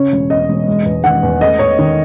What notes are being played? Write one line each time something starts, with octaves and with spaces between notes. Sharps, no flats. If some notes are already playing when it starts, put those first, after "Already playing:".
Already playing: C#3 C#5
E1
E2 D#5
E1
G#3
E2
D#3 F#5
E2
A3 D#5
E2 C#5
D#3